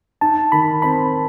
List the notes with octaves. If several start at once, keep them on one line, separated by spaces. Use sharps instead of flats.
D#4 A5
D#3 B5
C4 B5